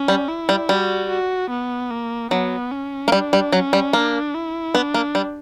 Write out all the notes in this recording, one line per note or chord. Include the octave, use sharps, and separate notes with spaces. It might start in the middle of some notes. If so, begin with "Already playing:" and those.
Already playing: C#4
G3
E4
G3
G3 F#4
F#4
B3
A#3
F#3 B3
C#4
A#3
G3 D4
G3
F#3 C#4
G3
A#3 D4
E4
B3 D4
A#3
G3